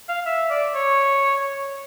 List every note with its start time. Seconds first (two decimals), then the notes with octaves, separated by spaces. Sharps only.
0.09 F5
0.26 E5
0.50 D5
0.74 C#5